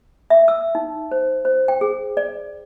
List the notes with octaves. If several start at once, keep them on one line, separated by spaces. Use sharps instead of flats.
E5
E6
D#4
C5
C5
G5
G#4
D5